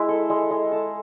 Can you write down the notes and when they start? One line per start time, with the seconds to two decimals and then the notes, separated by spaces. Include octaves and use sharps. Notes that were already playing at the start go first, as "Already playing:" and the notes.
Already playing: G#3 E4
0.09 A4
0.30 G#3
0.51 G#3
0.72 A4